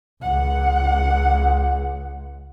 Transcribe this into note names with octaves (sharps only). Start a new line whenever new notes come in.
C#2 F#5